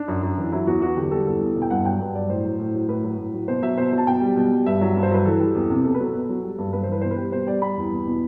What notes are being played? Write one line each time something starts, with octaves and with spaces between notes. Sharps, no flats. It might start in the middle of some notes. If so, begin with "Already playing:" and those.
Already playing: D4
F#2
F#2
E3
F#3 E4
E2 F#4
E2 F#4
D3 G4
G3 A4
E2 A4
E2
B2
G5
G2 F#5
F#3 G5
G2
F#3 D5
A2 C5
F#3
A2
F#3
A2 B4
F#3
A2
F#3
B2 C5
F#3 E5
B2 C5
F#3
A5
B2 G5
G3
B2
G3
G2 E5
F#3
G2
C5
F#3 B4
E3 A4
G3
E2
C3
B2 A4
B4
F#3 A4
B2
F#3
G3
G2
G2 B4
C5
E3 B4
B2 C5
B4
G3
B2 C5
G3 D5
G3 B5
E2
E2
B2